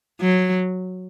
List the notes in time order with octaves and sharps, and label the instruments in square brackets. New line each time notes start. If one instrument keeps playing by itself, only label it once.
[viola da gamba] F#3